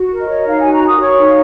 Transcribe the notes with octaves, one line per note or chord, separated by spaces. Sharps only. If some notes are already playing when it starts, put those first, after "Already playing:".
Already playing: F#4
A#4
D#5
C#5
D#4 F5
F#4 G#5
A#5
A#4 D#6
C#5 C#6
D#4
F5